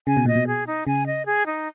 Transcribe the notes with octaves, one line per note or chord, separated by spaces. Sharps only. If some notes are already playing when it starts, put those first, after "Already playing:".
C#3 G#5
B2
A#2 D#5
B2
G#4
D#4
C#3 G#5
D#5
G#4
D#4